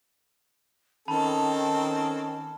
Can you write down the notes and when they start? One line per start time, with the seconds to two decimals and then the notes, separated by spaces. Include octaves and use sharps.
1.08 D#3 C4 C#4 A4 A5 B5